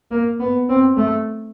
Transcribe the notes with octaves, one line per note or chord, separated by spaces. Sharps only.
A#3
B3
C4
A3